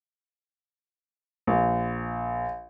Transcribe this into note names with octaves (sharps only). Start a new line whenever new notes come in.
A#1